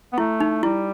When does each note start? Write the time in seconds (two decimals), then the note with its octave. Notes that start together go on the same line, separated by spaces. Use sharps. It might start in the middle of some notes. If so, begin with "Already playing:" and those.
0.13 B3
0.18 A3 E4
0.40 D#4
0.63 G3 E4